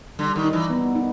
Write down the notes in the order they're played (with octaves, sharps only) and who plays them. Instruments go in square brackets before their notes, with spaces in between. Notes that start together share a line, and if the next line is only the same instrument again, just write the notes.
[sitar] D3 [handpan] G3
[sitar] D#3
[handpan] D#4
[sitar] E3
[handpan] B3
D#4